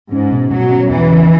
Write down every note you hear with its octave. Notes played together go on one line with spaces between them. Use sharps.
G#2 C#4
B2
B2 F#3
C#4
E2 E3
C#3